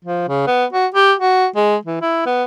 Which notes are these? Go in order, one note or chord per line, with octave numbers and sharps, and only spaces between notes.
F3
C#3
B3
F#4
G4
F#4
G#3
E3
E4
B3